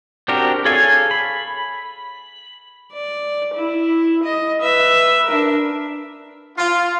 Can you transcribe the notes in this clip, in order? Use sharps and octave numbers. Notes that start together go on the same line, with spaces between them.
C4 D4 F#4 G4 A#4
G#4 A4 C#5 F5 G#5
B5
D5
E4
D#5
B4 E5
D4 A#4
F4